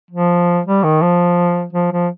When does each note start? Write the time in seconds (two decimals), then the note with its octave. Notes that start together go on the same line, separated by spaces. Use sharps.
0.11 F3
0.66 G3
0.83 D#3
1.02 F3
1.73 F3
1.92 F3